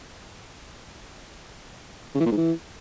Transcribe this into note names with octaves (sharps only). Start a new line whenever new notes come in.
C#3
E3
A#2
G#2
E3